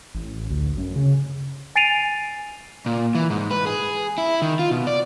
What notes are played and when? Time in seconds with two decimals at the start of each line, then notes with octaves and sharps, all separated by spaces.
0.15 A1
0.50 D2
0.77 F#2
0.96 C#3
1.76 G#5 A6 C7 D7 D#7 F7
2.86 A#2
3.15 E3
3.30 G#2
3.51 B4
3.67 G#4
4.18 E4
4.42 D#3
4.59 F4
4.71 B2
4.87 D5